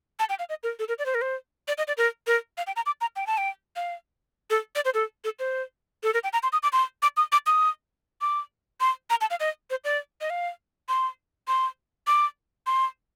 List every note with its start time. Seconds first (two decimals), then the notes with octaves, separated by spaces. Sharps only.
0.19 A5
0.29 G5
0.39 F5
0.49 D#5
0.63 A#4
0.79 A4
0.88 A#4
0.99 D5
1.06 C5
1.15 A#4
1.22 C5
1.68 D5
1.78 D#5
1.88 D5
1.98 A#4
2.27 A#4
2.58 F5
2.67 G5
2.76 A#5
2.86 D6
3.01 A#5
3.16 G5
3.27 A5
3.38 G5
3.76 F5
4.50 A4
4.75 D5
4.85 C5
4.94 A4
5.24 A4
5.39 C5
6.03 A4
6.14 A#4
6.24 G5
6.33 A#5
6.43 C6
6.53 D#6
6.63 D6
6.73 C6
7.02 D6
7.17 D#6
7.32 D6
7.47 D#6
8.21 D6
8.81 C6
9.10 A#5
9.21 A5
9.30 F5
9.40 D#5
9.70 C5
9.84 D5
10.21 D#5
10.30 F5
10.89 C6
11.48 C6
12.07 D6
12.67 C6